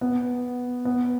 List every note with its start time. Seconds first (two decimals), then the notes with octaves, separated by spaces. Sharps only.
0.01 B3
0.85 B3